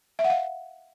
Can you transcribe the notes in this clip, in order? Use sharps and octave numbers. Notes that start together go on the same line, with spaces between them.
E5
F#5
F5